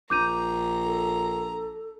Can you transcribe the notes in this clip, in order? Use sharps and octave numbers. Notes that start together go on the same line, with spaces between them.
A#1 A#5 D6 G6 D#7
A4